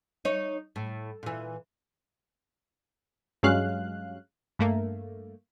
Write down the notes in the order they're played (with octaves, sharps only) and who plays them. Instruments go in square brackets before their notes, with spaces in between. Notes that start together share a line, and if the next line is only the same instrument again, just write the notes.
[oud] D#4 C#5
A2
A#2 E3
[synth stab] G2 F#3 G#3 C#4 F5 F#6
G2 A3 A#3